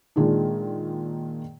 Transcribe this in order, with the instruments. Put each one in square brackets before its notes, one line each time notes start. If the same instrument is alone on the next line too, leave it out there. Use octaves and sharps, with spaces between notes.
[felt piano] A#2 D#3 G#3 D4 D#4